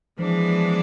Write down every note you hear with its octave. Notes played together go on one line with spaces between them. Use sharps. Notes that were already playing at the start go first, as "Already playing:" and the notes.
E3 F3 G#3 B3 D4